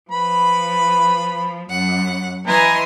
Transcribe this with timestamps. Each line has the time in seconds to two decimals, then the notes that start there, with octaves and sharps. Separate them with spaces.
0.11 F3 B4 B5
1.70 F#2 F#5
2.47 E3 B4 D#5 G#5 A#5 C6